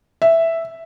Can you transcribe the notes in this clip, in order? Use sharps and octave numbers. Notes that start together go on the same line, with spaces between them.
E5